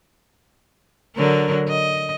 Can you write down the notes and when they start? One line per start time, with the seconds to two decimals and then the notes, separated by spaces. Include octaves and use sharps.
1.16 D3 F#3 A#4
1.68 D#5